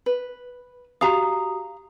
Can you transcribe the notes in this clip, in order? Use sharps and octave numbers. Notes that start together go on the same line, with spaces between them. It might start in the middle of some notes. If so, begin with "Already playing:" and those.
B4
F#4 G4 F5 A#5 D#6